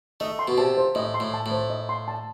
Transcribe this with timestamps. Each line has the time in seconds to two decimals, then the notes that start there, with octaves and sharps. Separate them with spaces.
0.20 A3 D#5
0.39 C6
0.48 B2
0.58 C3 A5
0.78 C5
0.95 A2 D#5
1.14 C6
1.20 A2
1.34 A5
1.46 A2
1.51 C5
1.70 D#5
1.89 C6
2.08 A5